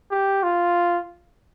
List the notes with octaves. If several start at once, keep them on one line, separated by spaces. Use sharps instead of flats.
G4
F4